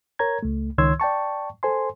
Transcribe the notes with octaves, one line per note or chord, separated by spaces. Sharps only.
A#4 C#5 A#5 G#6
C#2 A3
C#2 D#3 C#5 C6 E6 G#6
D5 G5 A5 C#6
A4 C5 G#5 C6